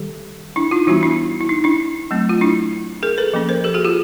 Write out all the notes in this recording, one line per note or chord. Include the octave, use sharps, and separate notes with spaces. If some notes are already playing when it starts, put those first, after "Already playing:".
Already playing: D#3 G3 G4 A4
D4 E4
D#4 F4
E3 G3 B3 D4 E4 F#4
D4 E4
E4
D#4
D4 E4
F#3 A3 C4
F4
D4 E4
G#4 A#4
A4 B4
F3 A#3 C#4
A#4 C5
G4 A4
F#4 G#4
F4 G4